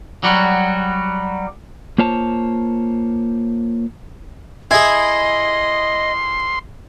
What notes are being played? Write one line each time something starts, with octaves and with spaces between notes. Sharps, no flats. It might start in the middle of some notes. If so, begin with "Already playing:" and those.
F#3 G3 F#4
A#3 F4 C5 C#5 A5
E4 G#4 D#5 G#5 C6